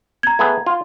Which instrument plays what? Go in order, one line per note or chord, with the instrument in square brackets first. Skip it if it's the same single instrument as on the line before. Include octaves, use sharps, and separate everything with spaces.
[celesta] A#5 G#6
[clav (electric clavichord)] A3 B3 G#4
F4